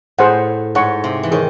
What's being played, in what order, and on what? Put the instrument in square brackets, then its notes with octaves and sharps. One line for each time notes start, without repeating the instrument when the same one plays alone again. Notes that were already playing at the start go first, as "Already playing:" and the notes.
[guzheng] A2 [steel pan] G#4 C5 F#5
[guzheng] G#2 [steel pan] A4 C#5 F#5 C#6
[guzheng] C3
E3
[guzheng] D#3 [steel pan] G#4 C#5